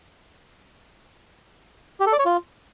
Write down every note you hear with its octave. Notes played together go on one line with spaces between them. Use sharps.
G4
A4
D5
C#5
F4